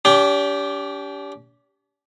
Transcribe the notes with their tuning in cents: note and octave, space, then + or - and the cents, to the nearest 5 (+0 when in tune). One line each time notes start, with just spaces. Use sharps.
D4 -45 G4 +0